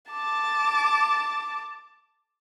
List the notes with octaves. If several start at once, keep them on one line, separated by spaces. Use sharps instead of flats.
A5 D6